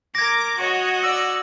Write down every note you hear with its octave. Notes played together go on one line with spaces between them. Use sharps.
A#4 D6 G#6 A#6
F#4 C#5 D#5
D5 E6